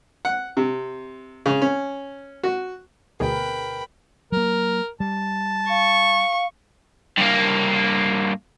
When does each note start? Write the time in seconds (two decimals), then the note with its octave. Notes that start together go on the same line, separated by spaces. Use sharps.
0.25 F#5
0.57 C3
1.46 C#3
1.62 C#4
2.43 F#4
3.20 D2 B2 G#4 A#4 B4 G5 B5
4.32 F#3 A#3 A#4
5.00 G3 A5
5.70 F5 C#6
7.18 G2 A#3